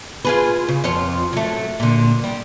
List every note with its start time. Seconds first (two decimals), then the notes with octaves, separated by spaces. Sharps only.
0.25 F4 G#4 B4
0.68 C#3
0.84 F2 F4 C#5
1.33 F#3 A3
1.80 A#2 D3
2.24 G3